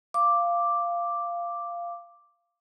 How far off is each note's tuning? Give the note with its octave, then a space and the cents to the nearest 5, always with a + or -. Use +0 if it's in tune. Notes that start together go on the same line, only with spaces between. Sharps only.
F5 -10 D6 +0